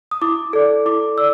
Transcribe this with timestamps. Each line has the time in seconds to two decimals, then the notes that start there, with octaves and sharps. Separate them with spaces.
0.11 D#6
0.22 E4 D6
0.53 A4 D5
0.86 E4 D6
1.17 D5 E6